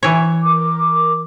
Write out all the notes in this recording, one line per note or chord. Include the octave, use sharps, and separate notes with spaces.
E3 C#5
A#4 D6